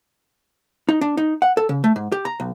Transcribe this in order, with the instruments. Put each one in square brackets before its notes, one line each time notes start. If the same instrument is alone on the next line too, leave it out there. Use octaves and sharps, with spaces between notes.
[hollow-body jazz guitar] D#4
D4
D#4
F#5
A4
C#3
A3
G#2
G4
A#5
B1